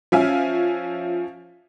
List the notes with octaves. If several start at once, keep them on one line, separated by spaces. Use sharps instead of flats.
F3 C#4 E5 F5 G#5